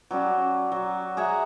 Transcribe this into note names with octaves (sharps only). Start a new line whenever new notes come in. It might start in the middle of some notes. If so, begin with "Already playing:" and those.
F#3 G3 C#4 D5
F#3
G#4 E5 F#5 A#5